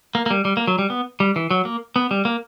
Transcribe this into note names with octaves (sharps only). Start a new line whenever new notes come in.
A#3
A#3
G3
G3
A#3
F#3
G3
B3
G3
E3
F#3
A#3
B3
G3
A#3